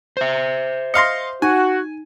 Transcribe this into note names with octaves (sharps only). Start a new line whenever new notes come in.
C5 E5
D#5 F5 C6 A#6 C#7
D#4 F#4 G#5